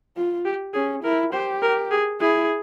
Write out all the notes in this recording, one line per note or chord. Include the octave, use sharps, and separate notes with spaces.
F4
G4
C#4 G#4
E4 A#4
G4 C5
A#4
G#4
E4 G#4